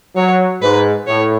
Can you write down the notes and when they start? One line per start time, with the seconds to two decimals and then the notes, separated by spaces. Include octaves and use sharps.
0.16 F#3 C#5
0.62 G#2 B4
1.07 A2 C#5